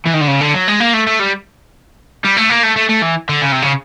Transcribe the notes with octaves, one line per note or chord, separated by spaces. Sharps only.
E3
D#3
D3
C#3
D3
F#3
G#3
A#3
A3
A3
G3
G3
A3
A#3
A3
A3
A3
E3
D3
C#3
C3
C#3